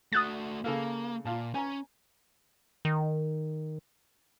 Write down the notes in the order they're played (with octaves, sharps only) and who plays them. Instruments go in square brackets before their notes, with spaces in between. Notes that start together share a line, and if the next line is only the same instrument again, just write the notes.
[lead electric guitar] A3 F#4 [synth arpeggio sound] D#6 F#6 A6
[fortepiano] C#3 A4 F5 [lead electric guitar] A#3
[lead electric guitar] A#2 [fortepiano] F4 F5 A5
[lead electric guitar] C#4 [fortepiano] G#5 A#5
[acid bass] D#3